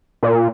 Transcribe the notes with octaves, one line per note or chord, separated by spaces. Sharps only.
A#2